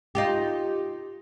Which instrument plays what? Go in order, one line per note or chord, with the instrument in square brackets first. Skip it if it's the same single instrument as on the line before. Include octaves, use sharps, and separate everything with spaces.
[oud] D#4 F4 G4